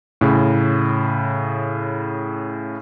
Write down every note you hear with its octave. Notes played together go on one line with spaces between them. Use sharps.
A2 C#3